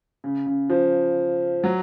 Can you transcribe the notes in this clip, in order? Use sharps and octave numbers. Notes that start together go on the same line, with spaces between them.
C#3
C#3
F3
F#3